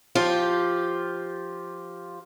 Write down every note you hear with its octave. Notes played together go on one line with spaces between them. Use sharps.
F3 F4 G4